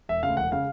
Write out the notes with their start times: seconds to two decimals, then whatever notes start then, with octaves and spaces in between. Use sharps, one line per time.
0.09 E1 E5
0.23 D2 C#3 F5
0.37 E1 F#5
0.52 C#3 F5